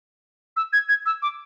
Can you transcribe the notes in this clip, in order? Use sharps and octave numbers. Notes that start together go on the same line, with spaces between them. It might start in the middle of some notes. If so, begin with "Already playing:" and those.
E6
G#6
G#6
E6
D6